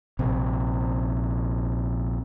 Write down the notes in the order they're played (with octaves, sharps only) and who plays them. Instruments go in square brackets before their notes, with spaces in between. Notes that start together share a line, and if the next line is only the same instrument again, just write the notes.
[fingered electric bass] A#1 C3